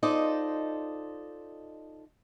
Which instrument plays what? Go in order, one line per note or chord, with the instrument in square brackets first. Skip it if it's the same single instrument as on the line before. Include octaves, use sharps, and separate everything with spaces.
[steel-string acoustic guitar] D#4 F4 A4 C5 D5 D#5